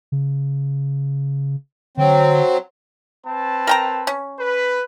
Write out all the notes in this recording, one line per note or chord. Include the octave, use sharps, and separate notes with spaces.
C#3
D3 F#3 C4
C4 B4 A5
A#4 G5 A#5
C#4
B4